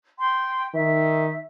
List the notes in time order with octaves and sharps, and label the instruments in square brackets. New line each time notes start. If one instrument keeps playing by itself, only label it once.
[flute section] G5 C6
[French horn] D#3 [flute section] E5